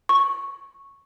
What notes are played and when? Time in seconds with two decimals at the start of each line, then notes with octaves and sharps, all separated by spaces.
0.09 C#6